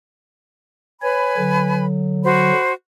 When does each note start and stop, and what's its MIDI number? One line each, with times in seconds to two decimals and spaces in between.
1.02 1.86 71
1.02 1.35 73
1.02 1.86 80
1.02 1.86 83
1.37 2.52 50
1.37 2.52 54
2.24 2.72 66
2.24 2.72 72
2.24 2.72 83